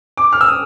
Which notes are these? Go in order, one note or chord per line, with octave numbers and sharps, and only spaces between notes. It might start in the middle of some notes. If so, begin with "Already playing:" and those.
D6
F6
E6
D#6